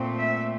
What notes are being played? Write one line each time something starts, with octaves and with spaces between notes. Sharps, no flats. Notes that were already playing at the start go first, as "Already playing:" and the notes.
Already playing: A#2 A3 C4
E5